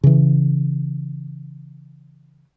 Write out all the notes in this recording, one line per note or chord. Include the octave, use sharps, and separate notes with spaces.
C#3 E3